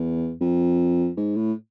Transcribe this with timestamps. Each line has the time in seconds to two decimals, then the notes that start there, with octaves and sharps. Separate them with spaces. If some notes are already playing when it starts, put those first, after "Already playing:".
Already playing: E2
0.41 F2
1.17 G#2
1.36 A2